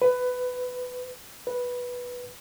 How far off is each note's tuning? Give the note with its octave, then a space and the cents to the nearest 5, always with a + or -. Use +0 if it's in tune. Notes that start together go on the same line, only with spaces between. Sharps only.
B4 +15
B4 -10